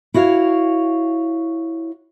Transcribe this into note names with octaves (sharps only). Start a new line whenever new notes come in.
E4 F#4 C#5 F5